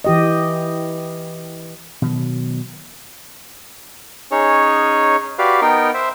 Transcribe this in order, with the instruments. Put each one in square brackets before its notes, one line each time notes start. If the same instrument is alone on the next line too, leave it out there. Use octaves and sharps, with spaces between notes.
[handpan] E3 G4 D#5
[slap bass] B2 D#3 F#3
[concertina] C#4 D#4 G#4 C#5
F#4 G4 B4 D5 F5
B3 D#4 A#4 G5
C5 E5